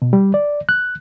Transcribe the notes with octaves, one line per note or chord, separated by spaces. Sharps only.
B2
G3
D5
F#6